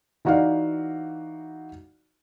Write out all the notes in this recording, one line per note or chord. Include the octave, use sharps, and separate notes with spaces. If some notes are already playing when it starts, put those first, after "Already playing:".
E3 D#4 F#4 D5 F5